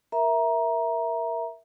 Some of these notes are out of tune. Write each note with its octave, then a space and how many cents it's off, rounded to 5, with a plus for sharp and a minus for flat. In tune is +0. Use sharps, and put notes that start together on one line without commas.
A#4 +5 E5 +0 A#5 +15